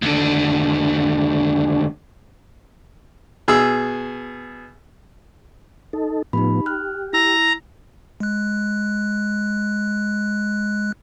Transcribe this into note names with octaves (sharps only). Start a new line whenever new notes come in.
D#2 D3
B2 G#4 E6
D#4 A4
A2 F3 B3 D#4 G4 B5
G4 F6 F#6
E4 A#5 E6 A#6
G#3 F#6